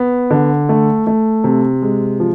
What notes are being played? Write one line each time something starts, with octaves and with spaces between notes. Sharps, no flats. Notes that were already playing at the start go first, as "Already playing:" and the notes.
Already playing: B3
D3
A3
A3
C3
G#3
F3